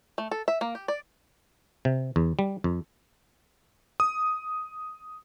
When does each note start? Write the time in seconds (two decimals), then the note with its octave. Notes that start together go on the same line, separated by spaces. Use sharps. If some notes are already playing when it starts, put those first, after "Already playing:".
0.18 A3
0.31 A4
0.48 E5
0.61 A#3
0.75 G4
0.88 D5
1.85 C3
2.16 E2
2.39 G3
2.64 F2
4.00 D#6